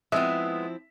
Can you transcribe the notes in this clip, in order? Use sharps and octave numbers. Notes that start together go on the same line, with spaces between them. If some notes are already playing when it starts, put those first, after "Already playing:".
F3 G#3 B3 C4 E4 E5